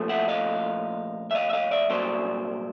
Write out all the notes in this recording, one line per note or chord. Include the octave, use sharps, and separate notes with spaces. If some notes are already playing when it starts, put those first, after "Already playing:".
Already playing: A#2 F3 A3
E5 F#5
D#5 F5
E5
D#5 F5
E5
D#5 F5
D5 E5
C2 A#2 F#3 C5 D5